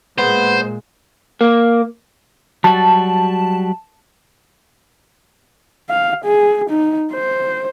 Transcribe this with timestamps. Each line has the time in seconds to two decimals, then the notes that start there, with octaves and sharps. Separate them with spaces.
0.18 A#2 G#3 B3 C5
1.41 A#3
2.64 F#3 G3 F#4 A5
5.90 F5
6.25 G#4
6.69 D#4
7.13 C5